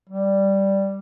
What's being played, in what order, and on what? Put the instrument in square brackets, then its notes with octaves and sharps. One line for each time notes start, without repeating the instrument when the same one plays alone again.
[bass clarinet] G3